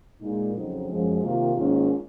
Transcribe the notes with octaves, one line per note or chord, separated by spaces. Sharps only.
A#2 G#3 D#4
F2 C#3 F#3 C4 D#4
F#2 F3 G#3
C3 D#3 A#3 F4
G#2 D#3 A#3 C#4 F4